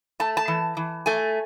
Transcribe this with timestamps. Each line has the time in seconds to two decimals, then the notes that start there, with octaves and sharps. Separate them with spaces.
0.20 A3 A5
0.37 A5
0.48 E3
0.77 E3
1.06 A3 G#5